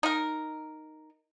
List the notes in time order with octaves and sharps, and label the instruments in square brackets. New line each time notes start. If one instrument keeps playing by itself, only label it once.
[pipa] D#4 A#4